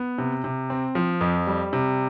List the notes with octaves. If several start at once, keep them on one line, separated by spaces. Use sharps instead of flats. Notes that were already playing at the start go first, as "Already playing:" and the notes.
Already playing: B3
C3
C3
C4
F3
F2
G3
C3